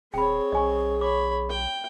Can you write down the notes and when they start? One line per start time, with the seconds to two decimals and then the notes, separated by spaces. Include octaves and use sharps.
0.14 D#1 C4 G#4 C#5 G5 B5
0.52 B1 D#5 G#5 C#6
1.01 C#5 B5 D6
1.50 G5